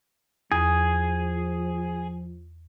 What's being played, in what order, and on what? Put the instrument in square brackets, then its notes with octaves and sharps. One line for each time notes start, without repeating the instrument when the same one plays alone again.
[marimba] E2 [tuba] F3 [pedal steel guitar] G#4